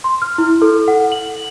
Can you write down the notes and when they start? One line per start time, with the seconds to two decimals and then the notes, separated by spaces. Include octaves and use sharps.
0.04 C6
0.22 F6
0.38 E4
0.62 A4
0.88 F#5
1.12 F#7